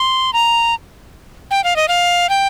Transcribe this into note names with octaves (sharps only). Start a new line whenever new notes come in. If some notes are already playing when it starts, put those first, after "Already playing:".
Already playing: C6
A#5
G5
F5
D#5
F5
G5